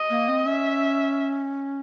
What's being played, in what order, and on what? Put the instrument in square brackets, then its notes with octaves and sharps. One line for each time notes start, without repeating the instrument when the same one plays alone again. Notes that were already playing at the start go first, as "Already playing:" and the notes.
Already playing: [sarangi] D#5
[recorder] A#3
C4
[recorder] C#4 [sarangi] E5